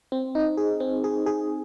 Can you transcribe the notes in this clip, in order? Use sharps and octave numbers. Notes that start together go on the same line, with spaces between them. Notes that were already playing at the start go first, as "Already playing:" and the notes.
C4
D#4
G#4
C4
G#4
G#4